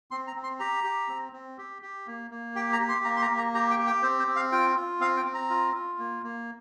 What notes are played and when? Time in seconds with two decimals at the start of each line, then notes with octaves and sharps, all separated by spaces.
0.11 C4 C6
0.27 A#5
0.36 C4
0.43 C6
0.59 G4 A#5
0.84 G4
1.08 C4
1.33 C4
1.58 G4
1.82 G4
2.07 A#3
2.31 A#3
2.56 G4 G5
2.73 A#5
2.80 G4
2.89 C6
3.04 A#3 A#5
3.16 C6
3.22 A#5
3.30 A#3
3.38 A#5
3.54 G4 A#5
3.70 G5
3.79 G4
3.87 G5
4.03 C4 C5
4.19 C5
4.27 C4
4.36 F5
4.52 F4 G5
4.76 F4
5.00 C4 F5
5.17 G5
5.25 C4
5.34 A#5
5.50 F4
5.74 F4
5.99 A#3
6.23 A#3